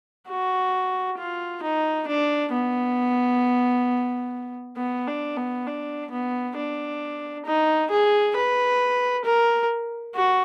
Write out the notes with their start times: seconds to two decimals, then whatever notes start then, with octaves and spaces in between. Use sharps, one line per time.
0.29 F#4
1.18 F4
1.63 D#4
2.07 D4
2.52 B3
4.77 B3
5.07 D4
5.37 B3
5.66 D4
6.11 B3
6.56 D4
7.45 D#4
7.90 G#4
8.36 B4
9.24 A#4
10.14 F#4